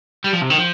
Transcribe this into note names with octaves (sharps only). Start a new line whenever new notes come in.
G3
F3
C3
D#3
F3